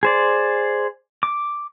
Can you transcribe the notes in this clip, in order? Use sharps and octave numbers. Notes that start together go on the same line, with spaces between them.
G#4 C5 D5
D6